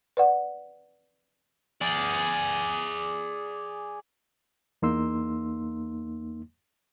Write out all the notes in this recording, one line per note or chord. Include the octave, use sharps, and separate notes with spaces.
B4 D5 F#5
G#4 D5
E2 A#3 D#4 C6 E6